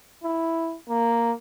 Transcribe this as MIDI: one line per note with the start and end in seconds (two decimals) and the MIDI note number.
0.23 0.76 64
0.89 1.32 58